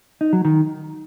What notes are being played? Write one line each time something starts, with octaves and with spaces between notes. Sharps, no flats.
D#4
F#3
D#3